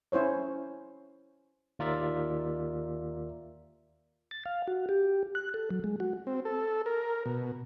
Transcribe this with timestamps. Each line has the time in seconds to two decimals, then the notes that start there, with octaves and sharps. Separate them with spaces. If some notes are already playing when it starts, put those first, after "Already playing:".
0.12 C#4 E4 C5 C#5
1.79 D#2 F4 A#4 D5 E5
4.31 A6
4.46 F5
4.67 F#4
4.89 G4
5.35 F#6
5.54 A4
5.71 F#3
5.84 G#3
6.00 F#4
6.27 C4
6.45 A4
6.86 A#4
7.26 B2